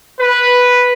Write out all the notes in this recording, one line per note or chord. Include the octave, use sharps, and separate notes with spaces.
B4